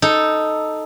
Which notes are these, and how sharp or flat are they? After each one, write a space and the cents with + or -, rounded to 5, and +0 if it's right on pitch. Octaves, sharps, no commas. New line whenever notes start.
D#4 +0 A4 +0